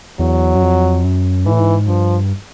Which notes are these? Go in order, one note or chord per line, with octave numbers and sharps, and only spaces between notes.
E2 F#3
F#2
F2
F#2
G#2 E3
A2
G#2
G2 F3